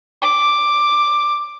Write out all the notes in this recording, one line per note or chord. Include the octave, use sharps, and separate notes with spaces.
D6